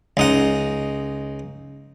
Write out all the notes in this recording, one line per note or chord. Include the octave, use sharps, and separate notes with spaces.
C#2 D#4 F#5